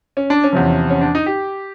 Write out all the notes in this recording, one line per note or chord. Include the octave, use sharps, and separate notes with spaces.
C#4
D4
C#4
E2 C3 F3
C#4
D4
D#4
G4